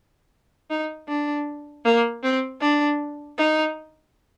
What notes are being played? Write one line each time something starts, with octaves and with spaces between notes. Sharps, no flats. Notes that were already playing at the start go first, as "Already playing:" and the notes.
D#4
D4
A#3
C4
D4
D#4